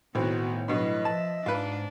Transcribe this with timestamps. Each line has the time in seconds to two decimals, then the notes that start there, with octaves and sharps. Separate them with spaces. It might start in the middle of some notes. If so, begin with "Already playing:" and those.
0.15 B1 A2 D#3 B3 C4 F#4
0.68 G2 B2 F#3 B4 D#5
1.05 F3 E5 A5
1.46 G#2 D4 F4 B4